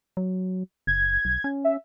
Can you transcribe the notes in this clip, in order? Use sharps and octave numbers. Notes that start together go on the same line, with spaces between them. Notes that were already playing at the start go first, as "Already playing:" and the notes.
F#3
F#1 G#6
B1
C#4
E5